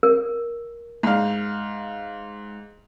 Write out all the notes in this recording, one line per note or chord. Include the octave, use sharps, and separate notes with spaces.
A#4
G#2 F5